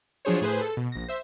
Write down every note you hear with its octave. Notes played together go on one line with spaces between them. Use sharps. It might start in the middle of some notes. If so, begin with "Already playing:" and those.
F3 F#3 D4 G#4 C5 C#5
A2 G#4 B4 C5
A4
B2
A#1 A#6
C5 E5